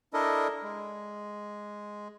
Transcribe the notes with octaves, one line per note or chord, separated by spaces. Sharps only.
D4 E4 A4 A#4 D#5
G#3